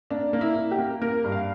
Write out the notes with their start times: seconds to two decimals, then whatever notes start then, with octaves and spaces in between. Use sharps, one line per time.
0.11 A#3 D4
0.33 A#3
0.41 E4
0.56 A#3
0.71 G4
0.79 A#3
1.02 A#3 A#4
1.24 G2
1.32 F5